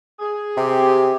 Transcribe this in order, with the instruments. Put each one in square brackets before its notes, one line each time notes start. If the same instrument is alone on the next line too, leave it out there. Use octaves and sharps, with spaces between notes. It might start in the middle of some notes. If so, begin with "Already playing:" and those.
[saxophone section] G#4
[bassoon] C3 [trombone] G4